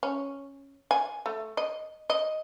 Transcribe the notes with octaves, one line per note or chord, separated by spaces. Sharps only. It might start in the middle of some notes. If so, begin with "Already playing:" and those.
C#4
G#5
A3
D#5
D#5